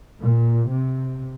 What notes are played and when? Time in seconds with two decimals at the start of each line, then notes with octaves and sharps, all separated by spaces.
0.21 A#2
0.72 C3